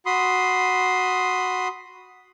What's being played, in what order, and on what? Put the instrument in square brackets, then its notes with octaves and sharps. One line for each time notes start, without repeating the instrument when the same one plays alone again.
[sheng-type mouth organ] F#4 B5 C6 D#6